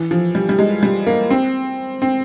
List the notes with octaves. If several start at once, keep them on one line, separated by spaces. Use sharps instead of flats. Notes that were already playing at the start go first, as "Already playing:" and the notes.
Already playing: E3
F3
G3
G3
G#3
G3
A#3
C4
C4